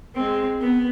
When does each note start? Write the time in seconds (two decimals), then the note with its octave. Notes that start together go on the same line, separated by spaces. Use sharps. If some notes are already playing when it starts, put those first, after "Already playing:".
0.15 G#3 C4
0.61 B3